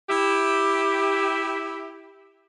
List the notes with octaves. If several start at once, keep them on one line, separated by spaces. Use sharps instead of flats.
E4 G4